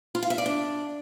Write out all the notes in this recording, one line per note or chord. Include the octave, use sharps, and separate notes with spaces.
F4
F5
E5
D5
D4